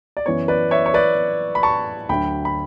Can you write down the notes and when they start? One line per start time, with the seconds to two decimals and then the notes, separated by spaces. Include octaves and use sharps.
0.17 D5
0.26 F#2 E3 B3 C#5
0.48 B4 D5
0.71 C#5 E5
0.86 C#5
0.94 B4 D5
1.55 B5
1.63 A5 C#6
2.09 D2 D3 F#3 G5 B5
2.45 B5